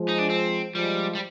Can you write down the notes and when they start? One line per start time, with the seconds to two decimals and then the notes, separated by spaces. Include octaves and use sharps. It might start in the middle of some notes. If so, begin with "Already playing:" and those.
Already playing: F3 G#3
0.09 D#4
0.18 D4
0.30 C4
0.74 F3 G3 G#3
1.15 G3